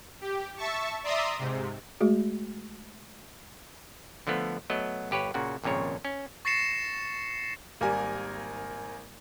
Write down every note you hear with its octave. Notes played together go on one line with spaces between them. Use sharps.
G4
E5 A5 C#6
D5 E5 A#5 C6 D#6
G#2 C3
G#3 A3 F#4 G#4
D3 F3 A3 B3
F#3 A3 B3 D#5
G1 G4 B4 C#5
A#2 C#3 F#4 F#5
G#1 F2 A#2 C#3 C#5
C#4
C#6 A6 A#6 C7 C#7 E7
G#1 G3 A#3 A#4 G#5